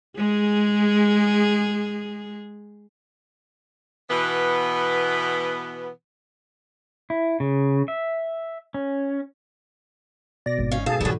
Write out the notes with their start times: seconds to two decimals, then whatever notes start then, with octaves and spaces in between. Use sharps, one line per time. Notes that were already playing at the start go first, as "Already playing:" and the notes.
0.18 G#3 G#4
4.10 B2 E3 B3
7.10 E4
7.40 C#3
7.88 E5
8.74 C#4
10.46 B2 D5 A#6
10.58 G#1
10.72 C#4 D#4 F5
10.86 G#2 B2 G#4 A4 F5 A5
11.01 D3 E3 F#3 G3